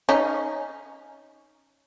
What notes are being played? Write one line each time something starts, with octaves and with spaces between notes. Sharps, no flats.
C#4 D#4